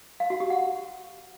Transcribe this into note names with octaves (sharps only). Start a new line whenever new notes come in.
F5
F#4
G4
F#5